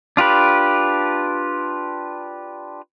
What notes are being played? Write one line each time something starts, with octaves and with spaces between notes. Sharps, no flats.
D4 F4 G4 B4